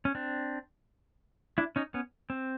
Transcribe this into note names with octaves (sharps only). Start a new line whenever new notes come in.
C#4
C4 D4
D4 E4
C#4 D#4
B3 C#4
C4